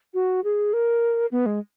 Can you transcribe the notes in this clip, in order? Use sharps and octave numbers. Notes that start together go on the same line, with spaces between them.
F#4
G#4
A#4
B3
G#3